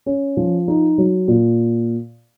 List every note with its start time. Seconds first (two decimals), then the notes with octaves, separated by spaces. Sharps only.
0.06 C#4
0.37 F3
0.68 D#4
0.98 F#3
1.28 A#2